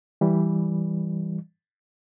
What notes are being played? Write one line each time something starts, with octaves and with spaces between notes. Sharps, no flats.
E3 G3